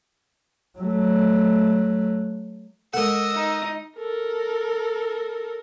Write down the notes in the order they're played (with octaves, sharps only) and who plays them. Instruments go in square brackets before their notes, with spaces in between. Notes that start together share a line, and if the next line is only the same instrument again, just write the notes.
[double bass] F#3 A3
[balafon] G#3 A4 [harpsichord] A#4 F#5 [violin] D#5 E6
[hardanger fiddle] D#4 D#6
[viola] A4 A#4